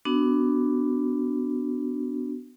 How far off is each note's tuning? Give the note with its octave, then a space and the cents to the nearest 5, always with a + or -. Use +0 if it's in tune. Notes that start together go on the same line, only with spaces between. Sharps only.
B3 +15 D4 +0 F#4 +10